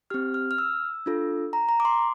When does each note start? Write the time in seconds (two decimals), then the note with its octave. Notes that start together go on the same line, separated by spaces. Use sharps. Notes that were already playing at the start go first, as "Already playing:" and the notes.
0.10 C4 G4 F6
0.34 F6
0.51 F6
0.58 E6
1.06 D4 F4 A4
1.53 A#5
1.69 A#5
1.80 D6
1.85 C6